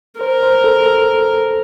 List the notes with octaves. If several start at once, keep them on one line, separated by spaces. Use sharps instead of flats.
A#4 C5
C5
A4
A4